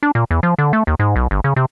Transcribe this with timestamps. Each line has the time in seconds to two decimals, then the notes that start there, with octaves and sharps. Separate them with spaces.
0.03 D4
0.15 A#2
0.31 E2
0.43 F3
0.58 D3
0.73 A3
0.87 D#2
0.99 G#2
1.16 B1
1.31 G1
1.44 C#3
1.56 C3